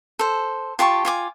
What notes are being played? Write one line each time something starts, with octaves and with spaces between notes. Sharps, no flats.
A4 C5
F4 G4 A5 C#6
F4 G#5 D6